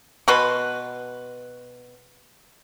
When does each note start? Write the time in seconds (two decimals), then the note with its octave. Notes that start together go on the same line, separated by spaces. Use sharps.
0.28 B2 F#4 B4 C6